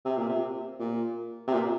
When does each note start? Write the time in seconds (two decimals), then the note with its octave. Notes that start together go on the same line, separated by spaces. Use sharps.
0.05 C3
0.17 A#2
0.29 C3
0.79 A#2
1.47 C3
1.54 A#2